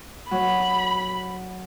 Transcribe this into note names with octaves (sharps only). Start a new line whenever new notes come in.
F#3 B5